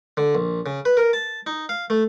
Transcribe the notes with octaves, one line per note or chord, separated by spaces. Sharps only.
D3
A#1
C#3
B4
A#4
A5
D#4
F5
A3